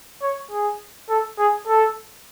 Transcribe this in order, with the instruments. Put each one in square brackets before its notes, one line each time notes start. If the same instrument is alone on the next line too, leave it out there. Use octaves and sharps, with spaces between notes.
[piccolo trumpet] C#5
G#4
A4
G#4
A4